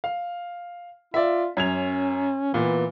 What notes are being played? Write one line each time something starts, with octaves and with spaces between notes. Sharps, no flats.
F5
F4 D5 E5
F#2 C#4 G#6 F7
A#2 E3 B3